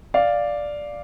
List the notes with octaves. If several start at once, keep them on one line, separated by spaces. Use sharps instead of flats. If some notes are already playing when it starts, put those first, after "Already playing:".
D5 F5